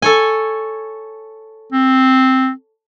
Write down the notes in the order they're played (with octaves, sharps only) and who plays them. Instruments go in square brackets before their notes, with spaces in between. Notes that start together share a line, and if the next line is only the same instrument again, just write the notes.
[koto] A4 C#5 G#5
[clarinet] C4